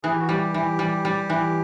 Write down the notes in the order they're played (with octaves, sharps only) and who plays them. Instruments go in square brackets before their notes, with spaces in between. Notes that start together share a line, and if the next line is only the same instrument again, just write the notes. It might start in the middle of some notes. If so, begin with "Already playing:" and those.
[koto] E3 [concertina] G#4
[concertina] G4
F#4
[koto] G3 [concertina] G4
[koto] E3
G3
G3
E3